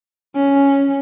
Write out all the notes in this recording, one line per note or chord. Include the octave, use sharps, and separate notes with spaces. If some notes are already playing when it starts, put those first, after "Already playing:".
C#4